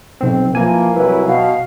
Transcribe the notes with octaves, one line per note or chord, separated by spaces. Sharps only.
B1 C4
E3 F3 A#3 G#5
C2 F#3 E4 B4
B2 F5